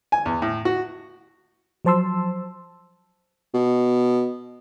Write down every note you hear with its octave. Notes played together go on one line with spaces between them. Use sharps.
G#5
E2
A2
F#4
F3 F#3 C5 A5 C6 E6
B2